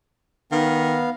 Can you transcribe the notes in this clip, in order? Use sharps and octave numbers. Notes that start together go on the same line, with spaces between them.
D#3 B3 F5